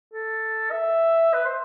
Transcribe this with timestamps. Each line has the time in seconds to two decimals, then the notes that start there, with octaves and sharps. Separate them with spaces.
0.13 A4
0.71 E5
1.33 B4
1.45 C5